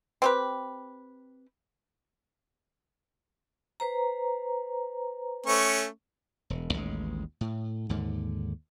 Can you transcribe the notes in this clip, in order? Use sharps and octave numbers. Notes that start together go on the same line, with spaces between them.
C4 G4 B4
B4 C5 A#5
A3 C#4 C#6
E1
A1 D#2 G#3
A2
D#2 G#2 D3